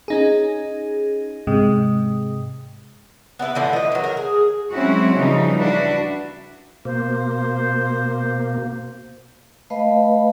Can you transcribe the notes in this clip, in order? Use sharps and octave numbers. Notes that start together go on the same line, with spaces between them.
C#4 D#4 G#4
G#2 C3 G#3
B3 D4 E4 B4
A2 D3 E3 F3
B4 D#5
D#3 F#3
A#4
G#4
F#3 G#3 C4 C#4 E4 F#4
C#3 E3 F3 G3 D#4
D4 E4 F#4 B4
B2 A#3 C5
A3 B4 D#5 F5 B5